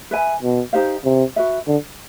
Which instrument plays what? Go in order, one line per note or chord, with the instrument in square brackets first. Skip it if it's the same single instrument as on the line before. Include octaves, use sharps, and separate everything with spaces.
[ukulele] B4 E5 G#5
[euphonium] B2
[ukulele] D#4 G4 C5 F5
[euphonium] C3
[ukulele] F#4 B4 E5
[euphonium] D3